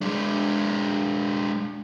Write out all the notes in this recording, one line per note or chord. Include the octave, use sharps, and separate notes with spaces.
G#3 D4